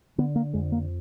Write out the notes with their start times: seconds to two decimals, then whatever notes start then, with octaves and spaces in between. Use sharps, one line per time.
0.18 D3 B3
0.36 A#3
0.54 F2 G#3
0.72 A#3